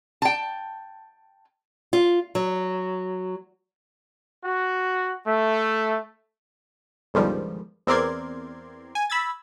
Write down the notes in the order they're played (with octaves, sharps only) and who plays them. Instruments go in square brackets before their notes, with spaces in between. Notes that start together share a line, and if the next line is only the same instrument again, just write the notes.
[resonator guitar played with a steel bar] G5 A5
[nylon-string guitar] F4
F#3
[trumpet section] F#4
A3
[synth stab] G1 C#2 G#2 D#3 F3 G3
E2 C4 A#4 D5 C6 G#6
G#5
B5 E6 G#6 A6